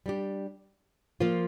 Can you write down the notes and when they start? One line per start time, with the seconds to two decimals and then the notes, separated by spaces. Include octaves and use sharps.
0.06 G3 D4 G4
1.20 F3 A#3 F4 C5